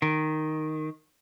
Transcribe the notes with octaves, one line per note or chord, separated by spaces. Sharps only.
D#3